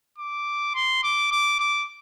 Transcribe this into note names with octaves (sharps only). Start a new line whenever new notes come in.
D6
C6
D6
D6
D6